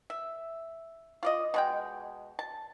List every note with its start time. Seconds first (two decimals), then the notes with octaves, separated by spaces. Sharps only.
0.10 E5
1.23 F4 D5 D#5
1.54 B2 G#3 G5
2.39 A5